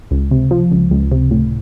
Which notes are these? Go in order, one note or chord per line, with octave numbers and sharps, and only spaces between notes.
C#2
C3
F3
C#2
C#2
C3
A2